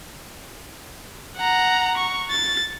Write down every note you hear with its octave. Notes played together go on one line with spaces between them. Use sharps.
F#5 A#5
C#6
A6